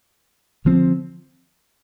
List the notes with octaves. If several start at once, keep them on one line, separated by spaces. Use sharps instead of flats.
D3 F3 C4